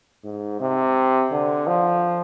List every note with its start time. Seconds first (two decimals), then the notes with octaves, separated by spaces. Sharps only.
0.24 G#2
0.60 C3
1.32 D3
1.67 F3